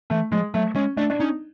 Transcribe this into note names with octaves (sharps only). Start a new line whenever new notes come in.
E3 A3
F3 G#3
F#3 A3
G#3 C#4
A3 D4
D4
C#4 D#4